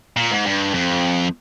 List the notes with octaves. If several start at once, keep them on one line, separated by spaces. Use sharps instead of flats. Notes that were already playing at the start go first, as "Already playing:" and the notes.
A#2
G#2
G2
F2